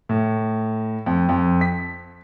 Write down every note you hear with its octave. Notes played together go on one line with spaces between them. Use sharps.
A2
F2
F2
B6